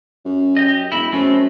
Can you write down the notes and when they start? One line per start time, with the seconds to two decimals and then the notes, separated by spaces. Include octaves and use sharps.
0.25 F#2
0.57 G4 D#5
0.92 E1 E4 B5
1.13 F#2 G#3 A3 C4